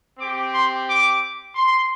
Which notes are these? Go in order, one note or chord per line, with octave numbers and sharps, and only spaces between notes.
C4 G4 D6
C6
D6
C6